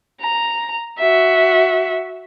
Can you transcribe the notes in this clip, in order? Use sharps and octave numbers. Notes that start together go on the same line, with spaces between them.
A#5
F#4 E5